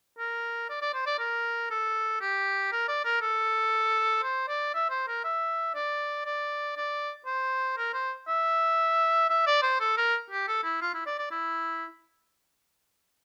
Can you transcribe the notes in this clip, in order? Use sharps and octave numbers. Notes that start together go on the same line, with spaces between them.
A#4
D5
D5
C5
D5
A#4
A4
G4
A#4
D5
A#4
A4
C5
D5
E5
C5
A#4
E5
D5
D5
D5
C5
A#4
C5
E5
E5
D5
C5
A4
A#4
G4
A4
E4
F4
E4
D5
D5
E4